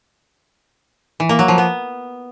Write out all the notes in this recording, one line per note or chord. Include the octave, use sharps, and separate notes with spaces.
E3
A#3
F#3
F3
B3